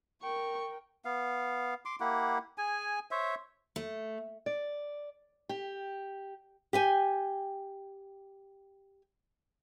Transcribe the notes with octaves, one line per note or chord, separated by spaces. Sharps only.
A#4 G5 C#6
B3 F5
C6 D6
A#3 E4 G4 F#5
G#4 G#5
C5 C#5 E5
A3
D5
G4
G4 G5 G#5